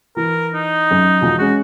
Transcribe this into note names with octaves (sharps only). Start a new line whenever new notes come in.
E3 A#4
D#4
F#2
E1 F3 F#4
G#3 C#4 F#4